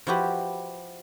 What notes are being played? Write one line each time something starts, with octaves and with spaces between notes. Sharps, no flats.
F3 E4 F#4 G4 B4